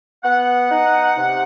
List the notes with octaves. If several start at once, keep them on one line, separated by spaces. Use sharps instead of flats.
B3 F#5
D#4
C3